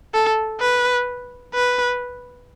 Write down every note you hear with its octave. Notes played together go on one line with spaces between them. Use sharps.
A4
B4
B4